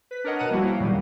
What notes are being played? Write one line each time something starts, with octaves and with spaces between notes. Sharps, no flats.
B4 B6
D4 A#4 C#5 D#5 F#5
B2 F#5 A5 A#5 D#7
F3 G3 A#3 E4 F#4
F5 G5
E2 A#2 D#3 F#3 G3